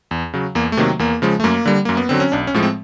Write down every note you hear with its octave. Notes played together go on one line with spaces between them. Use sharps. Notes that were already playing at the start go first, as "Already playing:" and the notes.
E2
C#3 F#3
E2 A#3
A3
C3 D#3 F#3 A#3
E2 A#3
C#3 F3 G#3
A3
F#2 A#3
D3 G3
F#2 A#3
B3
D3 F#3 C4
C#4
B1 D4
C#4
A2 F3 G#3
C4